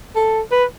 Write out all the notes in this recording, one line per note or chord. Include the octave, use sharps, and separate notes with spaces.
A4
B4